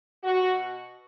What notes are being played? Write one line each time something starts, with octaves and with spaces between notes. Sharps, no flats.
B2 F#4